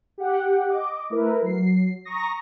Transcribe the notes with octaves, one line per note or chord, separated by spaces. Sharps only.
G4 F#5 G5
D#5 D6
A3 E4 A#4 B4
F#3 C7
A#5 C#6 D#6 A#6